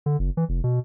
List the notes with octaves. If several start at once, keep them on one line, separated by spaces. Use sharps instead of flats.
D3
F#1
E3
F1
B2